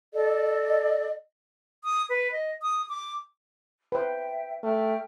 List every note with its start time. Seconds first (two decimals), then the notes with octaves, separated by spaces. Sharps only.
0.14 A4 D5 D#5
1.84 D#6
2.10 B4
2.32 D#5
2.62 D#6
2.89 D6
3.92 B4 C5 E5 G5
4.63 A3 E5 G5 F6